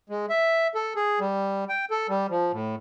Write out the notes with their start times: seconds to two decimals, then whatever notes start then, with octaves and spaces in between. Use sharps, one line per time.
0.09 G#3
0.30 E5
0.75 A4
0.96 G#4
1.20 G3
1.69 G5
1.91 A4
2.09 G3
2.30 F3
2.52 A2